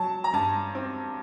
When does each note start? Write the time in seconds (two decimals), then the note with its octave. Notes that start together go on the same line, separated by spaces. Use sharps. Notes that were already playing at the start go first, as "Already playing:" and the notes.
Already playing: F#3 A5
0.24 A#5
0.33 G2 A5
0.75 C4